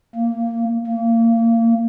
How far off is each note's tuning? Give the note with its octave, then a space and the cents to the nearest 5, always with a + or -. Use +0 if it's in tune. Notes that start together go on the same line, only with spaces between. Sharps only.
A#3 -15
A#3 -25